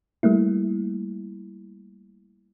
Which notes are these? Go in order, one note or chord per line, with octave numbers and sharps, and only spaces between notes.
G3 A3 A#3 E4